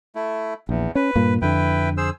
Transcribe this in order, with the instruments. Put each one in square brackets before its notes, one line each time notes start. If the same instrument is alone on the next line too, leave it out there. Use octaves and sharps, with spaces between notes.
[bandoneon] A3 E4
[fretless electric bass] A#1 [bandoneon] E2
[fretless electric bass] C#4 [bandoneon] B4
[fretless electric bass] G2 A#2 A#3
[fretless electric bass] F2 D3 [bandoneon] E4 B4 G5
[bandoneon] G#4 C5 E6